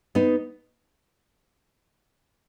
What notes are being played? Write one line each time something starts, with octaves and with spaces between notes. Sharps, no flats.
B3 D#4